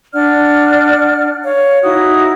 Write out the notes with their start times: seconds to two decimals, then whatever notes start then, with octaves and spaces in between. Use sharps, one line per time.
0.14 D4 D5 F#5 F6
1.44 C#5 F5
1.84 D#4 E4 F#4 D#6